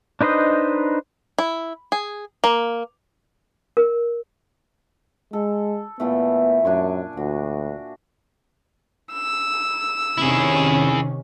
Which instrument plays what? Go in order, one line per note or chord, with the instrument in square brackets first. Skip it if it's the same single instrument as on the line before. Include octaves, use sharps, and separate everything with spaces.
[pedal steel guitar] D4 D#4 B4 C5 D#5
[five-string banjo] E4
G#4
A#3
[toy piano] A#4
[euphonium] G#3 [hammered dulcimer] A4
[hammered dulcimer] A#2 E3 A3 [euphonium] B3
[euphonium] F#2 [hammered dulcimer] D4 G#5 C#6
[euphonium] D2 [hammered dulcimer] F#4
[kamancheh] E6
[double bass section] C3 D#3 C#4 [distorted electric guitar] E4 G#4